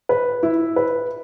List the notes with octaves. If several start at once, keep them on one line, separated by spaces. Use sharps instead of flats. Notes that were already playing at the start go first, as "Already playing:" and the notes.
B4
E4
B4